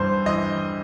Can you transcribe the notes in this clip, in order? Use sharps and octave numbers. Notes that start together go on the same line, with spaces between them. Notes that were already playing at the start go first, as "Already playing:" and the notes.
Already playing: G2 E3 C5
E3 D#5